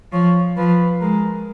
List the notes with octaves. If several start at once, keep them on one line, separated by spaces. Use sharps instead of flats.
F3 C#5
F3 B4
G#3 A#4